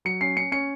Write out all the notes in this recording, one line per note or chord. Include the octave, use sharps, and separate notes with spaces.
F#3 C#7
C#4 C7
C#4 C#7
C#4 C#7